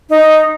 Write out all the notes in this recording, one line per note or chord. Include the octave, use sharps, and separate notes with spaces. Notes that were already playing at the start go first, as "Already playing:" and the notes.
D#4